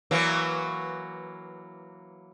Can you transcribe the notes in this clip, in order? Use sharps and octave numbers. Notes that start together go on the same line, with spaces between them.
E3 F#3 A#3